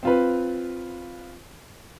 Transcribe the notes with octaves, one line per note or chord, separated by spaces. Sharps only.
C4 F4 B4